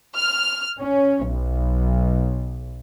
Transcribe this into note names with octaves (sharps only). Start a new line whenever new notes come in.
F6
C#4
B1